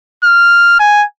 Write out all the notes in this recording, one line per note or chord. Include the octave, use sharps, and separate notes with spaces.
F6
G#5